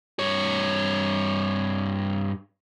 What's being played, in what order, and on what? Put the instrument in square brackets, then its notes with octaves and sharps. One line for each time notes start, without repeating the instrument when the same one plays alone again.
[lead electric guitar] G2 C#5